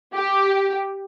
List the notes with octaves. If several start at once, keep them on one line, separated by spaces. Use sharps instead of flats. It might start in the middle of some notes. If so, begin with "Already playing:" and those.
G4